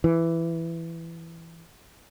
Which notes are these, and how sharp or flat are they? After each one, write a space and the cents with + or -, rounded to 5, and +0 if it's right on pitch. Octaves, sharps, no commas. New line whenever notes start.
E3 +10